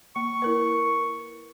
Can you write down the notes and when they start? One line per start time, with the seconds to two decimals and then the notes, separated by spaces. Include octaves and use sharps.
0.16 A#3 C#6
0.42 E4 A#4 B4